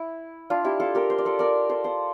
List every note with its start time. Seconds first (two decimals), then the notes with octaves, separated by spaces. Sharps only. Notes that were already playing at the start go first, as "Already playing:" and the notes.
Already playing: E4
0.50 D4 F4
0.65 E4 G4
0.80 F4 A4
0.95 G4 A#4
1.10 C5
1.18 D5
1.25 A4 C5
1.39 A#4 D5
1.69 A4 C5
1.84 A4 C5